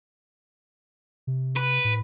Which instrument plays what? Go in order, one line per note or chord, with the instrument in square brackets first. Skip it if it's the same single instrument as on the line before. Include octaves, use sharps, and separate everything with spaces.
[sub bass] C3
[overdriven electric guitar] B4
[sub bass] A2